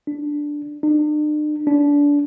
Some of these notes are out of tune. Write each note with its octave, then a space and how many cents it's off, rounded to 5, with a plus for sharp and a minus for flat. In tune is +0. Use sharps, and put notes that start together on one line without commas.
D4 +0
D4 +45
D4 -25